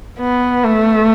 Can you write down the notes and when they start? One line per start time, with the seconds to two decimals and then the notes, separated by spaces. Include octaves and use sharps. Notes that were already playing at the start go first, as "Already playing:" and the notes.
0.19 B3
0.64 A3